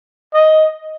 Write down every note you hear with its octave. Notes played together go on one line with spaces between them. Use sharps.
D#5